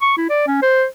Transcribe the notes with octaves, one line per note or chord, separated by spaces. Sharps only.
C#6
E4
D5
C#4
C5